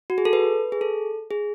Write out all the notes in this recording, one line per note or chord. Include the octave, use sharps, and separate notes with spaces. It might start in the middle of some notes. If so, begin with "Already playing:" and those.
F#4
G#4
A4
B4
G#4
A4
G#4